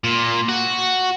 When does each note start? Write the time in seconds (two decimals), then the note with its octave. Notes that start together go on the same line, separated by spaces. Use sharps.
0.04 A#2
0.49 F#4